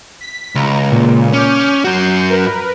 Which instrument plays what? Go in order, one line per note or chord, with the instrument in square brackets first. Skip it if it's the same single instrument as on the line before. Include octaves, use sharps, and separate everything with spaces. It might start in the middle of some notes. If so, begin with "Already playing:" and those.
[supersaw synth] B6
[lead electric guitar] C#2 [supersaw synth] A#5
[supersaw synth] A#2
[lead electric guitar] C#4 [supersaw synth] D6 F6 G6
[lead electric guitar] F#2 F#4 [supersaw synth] G6 C7
[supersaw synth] A#4 B4